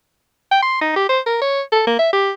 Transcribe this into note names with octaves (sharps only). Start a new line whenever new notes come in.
G5
C6
D#4
G4
C5
A#4
C#5
A4
A#3
E5
G4